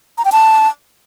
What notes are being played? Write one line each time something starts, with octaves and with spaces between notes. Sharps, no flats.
A#5
G5
A5